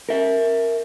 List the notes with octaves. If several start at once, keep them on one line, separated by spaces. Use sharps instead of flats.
A#4 E5